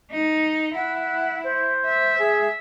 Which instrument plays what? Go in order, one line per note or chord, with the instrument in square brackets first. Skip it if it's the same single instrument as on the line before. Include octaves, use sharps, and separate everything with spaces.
[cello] D#4
[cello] E4 [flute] F#5
[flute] C5
[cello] E5
[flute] G#4